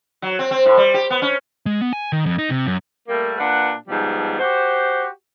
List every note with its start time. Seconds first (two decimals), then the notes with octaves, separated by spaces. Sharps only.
0.22 F#3
0.39 C4
0.51 C4
0.66 A2
0.77 G3
0.94 G4
1.10 B3
1.22 C#4
1.66 G#3
1.81 B3
1.93 G#5
2.12 D#3
2.26 F2
2.38 D#4
2.50 C3
2.66 F#2
3.09 G3 A3 A#3
3.38 A#2 D4 B4 F#5
3.88 G#2 B2 F3 G3
4.40 F#4 G4 C5